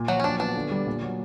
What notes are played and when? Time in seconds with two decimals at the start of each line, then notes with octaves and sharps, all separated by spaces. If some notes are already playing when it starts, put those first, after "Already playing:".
Already playing: A#2
0.08 F3 F#3 F#4
0.20 C#4
0.24 F#3 D4
0.40 B3 D4
0.55 D3
0.71 G3
0.86 A#2
1.02 F#3